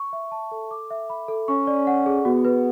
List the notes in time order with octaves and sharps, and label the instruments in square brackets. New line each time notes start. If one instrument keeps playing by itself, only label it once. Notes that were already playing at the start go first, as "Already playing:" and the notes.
Already playing: [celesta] C#6
E5
A5
A4
D6
E5
B5
A4
[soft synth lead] C#4 [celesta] C#6
[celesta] D5
F#5
G#4
[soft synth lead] B3 [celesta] F#4
[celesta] B4